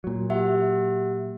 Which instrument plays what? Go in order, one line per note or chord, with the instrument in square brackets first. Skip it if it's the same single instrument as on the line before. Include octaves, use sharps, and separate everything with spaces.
[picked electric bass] A#2 F#3
[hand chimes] G4 E5 F#5